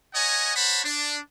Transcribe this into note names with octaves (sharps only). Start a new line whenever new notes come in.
C#5 D#5 F#5 G#5 A#5
C5 C#5 F#5 A5 B5
D4